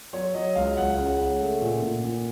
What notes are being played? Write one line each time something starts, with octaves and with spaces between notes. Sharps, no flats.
F#3 C#5
F#3 D#5
C#2 F5
C#2 F#5
C#3
C#3
A3
A#2
A#2
A#2